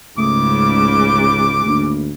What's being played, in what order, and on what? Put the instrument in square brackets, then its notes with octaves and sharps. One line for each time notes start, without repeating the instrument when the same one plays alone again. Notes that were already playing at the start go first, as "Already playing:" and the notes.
[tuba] C#2 [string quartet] G#2 C#3 [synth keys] A3 D#6 [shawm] D6
[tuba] D2 [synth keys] A3 A#3 D4